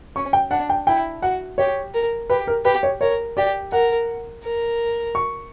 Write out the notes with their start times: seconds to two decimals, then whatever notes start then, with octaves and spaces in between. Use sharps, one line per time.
0.16 C#4 C#6
0.33 G5
0.51 D4 F#5
0.70 G5
0.87 E4 G5
1.22 F#4 F#5
1.58 G4 C#5
1.94 A#4
2.30 G4 B4
2.47 A#4
2.65 G4 B4
2.83 C#5
3.01 A#4 C#5
3.37 G4 D5
3.72 A#4 F#5
4.44 A#4
5.15 C#6